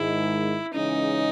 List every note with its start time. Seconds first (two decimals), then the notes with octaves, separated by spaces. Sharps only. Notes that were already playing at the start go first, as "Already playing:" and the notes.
Already playing: G#2 D#3 G#3 E4
0.74 C#3 E3 G#3 C#4 D#4